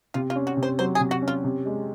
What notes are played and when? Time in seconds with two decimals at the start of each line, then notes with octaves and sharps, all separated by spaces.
0.14 C3 F4
0.30 F4
0.35 C#4
0.47 F#4
0.57 C3
0.63 C5
0.79 F#3 C5
0.95 G#4
1.00 C3
1.11 F#4
1.22 C#4
1.28 F4
1.44 C3
1.65 G#3